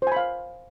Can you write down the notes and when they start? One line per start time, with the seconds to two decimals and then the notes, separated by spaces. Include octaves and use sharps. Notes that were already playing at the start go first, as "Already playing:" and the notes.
0.02 C5
0.07 G#5
0.12 B5
0.16 F5